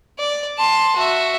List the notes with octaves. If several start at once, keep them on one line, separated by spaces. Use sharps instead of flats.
D5
A5 C6
F#4 E5